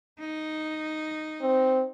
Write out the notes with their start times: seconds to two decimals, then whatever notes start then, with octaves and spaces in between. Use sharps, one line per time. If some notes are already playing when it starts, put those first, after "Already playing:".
0.20 D#4
1.42 C4